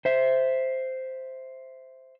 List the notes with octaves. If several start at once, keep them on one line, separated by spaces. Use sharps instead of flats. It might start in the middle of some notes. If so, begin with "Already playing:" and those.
C5 E5